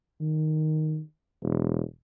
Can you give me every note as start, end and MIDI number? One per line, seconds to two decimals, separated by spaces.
0.20 1.00 51
1.43 1.82 28